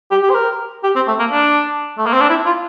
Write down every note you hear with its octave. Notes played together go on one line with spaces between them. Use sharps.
G4
G4
C5
A#4
G4
C4
A3
A#3
D4
A3
A#3
C4
D4
E4
F4